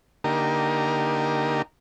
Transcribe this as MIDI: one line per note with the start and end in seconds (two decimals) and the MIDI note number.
0.24 1.62 50
0.24 1.62 58
0.24 1.62 63
0.24 1.62 67
0.24 1.62 70